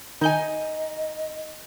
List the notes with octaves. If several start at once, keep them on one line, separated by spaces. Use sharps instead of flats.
D#3 D#4 D#5 G#5 G6